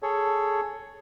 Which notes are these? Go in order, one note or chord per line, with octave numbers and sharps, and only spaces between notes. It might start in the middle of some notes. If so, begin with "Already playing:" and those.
G#4 A4 C#5